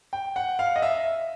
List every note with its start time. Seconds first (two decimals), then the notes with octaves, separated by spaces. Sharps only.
0.13 G5
0.36 F#5
0.59 F5
0.76 D#5
0.82 E5